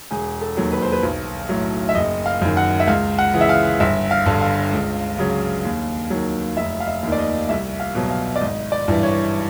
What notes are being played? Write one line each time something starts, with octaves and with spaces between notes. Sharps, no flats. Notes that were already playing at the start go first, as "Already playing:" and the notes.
E1 G#4
A4
D#2 D#3 F#3
B4
C5
B4
B1
A2 F#3
E5
F#1 D#5
F5
F#2 D#3
F#5
E5
C#2 F5
F#5
C#3 E3
E5
F5
G1 E5
F5
G2 D3
F5
C#2
C#3 F#3
D#2
D#3 F#3
F1 E5
F5
E5
D#2 D#3
D5
D#5
C2 E5
F5
B2 F#3
F5
D5
G#1 D#5
D5
G2 E3
C#5